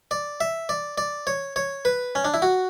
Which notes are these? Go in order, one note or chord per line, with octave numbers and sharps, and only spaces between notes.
D5
E5
D5
D5
C#5
C#5
B4
C#4
D4
E4
F#4